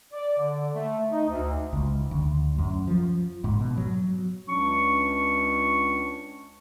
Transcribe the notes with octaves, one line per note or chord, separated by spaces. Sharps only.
D5
D3
A3
D#4
D2
C#2
D2
F#2
F3
G#2
B2
F#3
C#2 C#4 D4 C#6